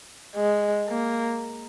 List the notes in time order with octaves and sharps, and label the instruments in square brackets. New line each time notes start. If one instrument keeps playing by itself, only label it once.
[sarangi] G#3
A#3